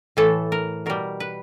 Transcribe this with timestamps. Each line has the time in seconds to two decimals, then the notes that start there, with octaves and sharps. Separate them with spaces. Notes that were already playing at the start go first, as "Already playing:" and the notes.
0.17 A2 E3 A3 A4
0.52 A#4
0.86 B2 G3 A#4
1.20 B4